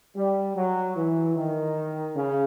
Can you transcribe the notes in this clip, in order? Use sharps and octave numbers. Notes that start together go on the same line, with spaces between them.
G3
F#3
E3
D#3
C#3